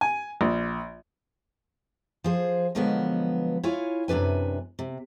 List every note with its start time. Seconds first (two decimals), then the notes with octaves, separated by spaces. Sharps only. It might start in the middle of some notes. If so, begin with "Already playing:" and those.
0.01 G#5
0.41 A#1
2.24 F3 G#4 C5
2.75 B2 D3 F3 F#3 G#3 B3
3.63 E4 F4 C#5 G#5
4.08 F#2 C3 D4 B4 G#5
4.79 C3